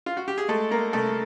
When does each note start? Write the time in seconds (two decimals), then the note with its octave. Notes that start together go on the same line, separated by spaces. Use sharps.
0.06 F4
0.17 F#4
0.28 G4
0.38 G#4
0.48 G#3 A3 A4
0.71 G#3 A#3 A#4
0.93 C2 A3 A4